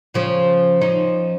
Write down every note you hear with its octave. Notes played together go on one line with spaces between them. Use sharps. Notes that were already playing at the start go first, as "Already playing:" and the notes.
C#3 F3 C#4
F3 C#4 D#4